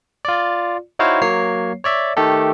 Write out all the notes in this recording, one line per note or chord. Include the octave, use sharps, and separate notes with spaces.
F4 D5
D#4 E4 F#4 C5 C#5 F5
F#3 A#3 C#5 C7
C#5 D5 E5
D#3 A3 G4 A4